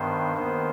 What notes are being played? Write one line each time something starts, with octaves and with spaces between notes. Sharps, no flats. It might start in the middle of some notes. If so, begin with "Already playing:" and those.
Already playing: G2 D#3 B3 C5
D#2 D#3 B3 C5